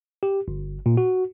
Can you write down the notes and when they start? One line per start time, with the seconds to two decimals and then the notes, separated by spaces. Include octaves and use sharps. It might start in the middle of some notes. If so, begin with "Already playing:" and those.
0.23 G4
0.48 G1
0.86 A#2
0.97 F#4